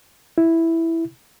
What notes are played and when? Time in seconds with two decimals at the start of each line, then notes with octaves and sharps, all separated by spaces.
0.38 E4